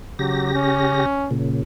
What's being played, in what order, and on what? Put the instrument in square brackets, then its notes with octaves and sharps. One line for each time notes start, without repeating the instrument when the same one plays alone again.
[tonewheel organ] C#3 G4 A#6 [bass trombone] F#3
[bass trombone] C#4
[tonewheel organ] A#2 C#3